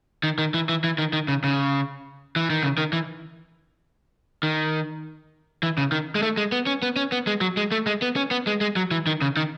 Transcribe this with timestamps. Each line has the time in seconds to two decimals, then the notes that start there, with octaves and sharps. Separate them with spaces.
0.24 D#3
0.38 D#3
0.54 E3
0.69 E3
0.84 E3
0.98 D#3
1.13 D#3
1.28 C#3
1.44 C#3
2.36 E3
2.50 D#3
2.63 C#3
2.78 D#3
2.93 E3
4.43 D#3
5.63 E3
5.78 C#3
5.92 D#3
6.15 G#3
6.22 A3
6.37 G#3
6.52 B3
6.67 C#4
6.82 B3
6.96 C#4
7.12 B3
7.27 G#3
7.41 F#3
7.57 G#3
7.72 A3
7.86 G#3
8.02 B3
8.16 C#4
8.31 B3
8.47 G#3
8.61 G#3
8.76 F#3
8.91 E3
9.07 D#3
9.22 C#3
9.37 D#3